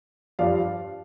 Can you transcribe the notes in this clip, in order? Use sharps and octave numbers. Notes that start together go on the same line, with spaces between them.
G2 F3 D5 F5